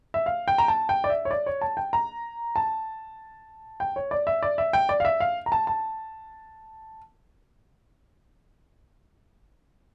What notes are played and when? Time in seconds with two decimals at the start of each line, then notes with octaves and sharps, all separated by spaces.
0.14 E5
0.26 F5
0.48 G5
0.58 A#5
0.68 A5
0.89 G5
1.04 D5
1.10 E5
1.25 C#5
1.31 D5
1.46 C#5
1.61 A5
1.77 G5
1.93 A#5
2.56 A5
3.80 G5
3.96 C#5
4.11 D5
4.27 E5
4.43 D5
4.58 E5
4.73 G5
4.89 D5
5.00 F5
5.05 E5
5.20 F5
5.46 A#5
5.52 A5
5.67 A5